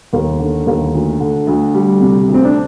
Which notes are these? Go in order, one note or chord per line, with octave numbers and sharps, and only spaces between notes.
D#2
D3
D#2
D2
D3
D2
G3
C3
D2
C4
D4